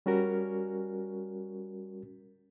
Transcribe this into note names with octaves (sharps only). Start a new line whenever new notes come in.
G3 C#4 F#4 A#4